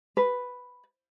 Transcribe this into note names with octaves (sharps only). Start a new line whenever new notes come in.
B4